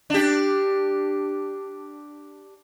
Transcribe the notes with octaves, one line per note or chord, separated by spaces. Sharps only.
D4 G4